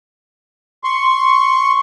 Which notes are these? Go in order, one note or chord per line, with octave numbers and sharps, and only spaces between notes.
C6 C#6